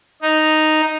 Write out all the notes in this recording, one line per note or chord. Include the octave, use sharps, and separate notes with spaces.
D#4